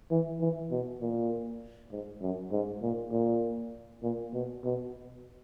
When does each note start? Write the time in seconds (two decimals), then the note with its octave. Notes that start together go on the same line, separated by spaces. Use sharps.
0.11 E3
0.40 E3
0.71 B2
1.01 A#2
1.91 G#2
2.21 F#2
2.52 G#2
2.82 A#2
3.12 A#2
4.03 A#2
4.33 B2
4.64 B2